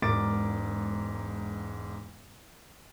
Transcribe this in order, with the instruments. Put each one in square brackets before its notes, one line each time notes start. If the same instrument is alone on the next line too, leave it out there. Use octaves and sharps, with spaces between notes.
[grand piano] E1 G#2 A#4 D6 A6 D7